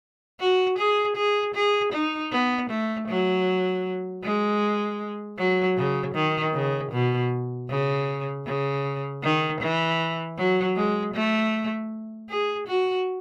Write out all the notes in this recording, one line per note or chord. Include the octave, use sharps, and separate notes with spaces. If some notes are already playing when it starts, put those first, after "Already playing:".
F#4
G#4
G#4
G#4
D#4
B3
A3
F#3
G#3
F#3
C#3
D#3
C#3
B2
C#3
C#3
D#3
E3
F#3
G#3
A3
G#4
F#4